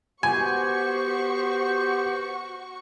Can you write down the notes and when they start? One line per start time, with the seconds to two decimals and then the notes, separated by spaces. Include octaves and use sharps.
0.23 B3 F#4 G4 C5 G#5 C#6